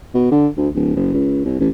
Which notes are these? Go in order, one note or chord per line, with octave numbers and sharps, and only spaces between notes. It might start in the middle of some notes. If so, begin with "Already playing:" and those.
B2
D3
D2
D1
F#1
C#2
C2
A1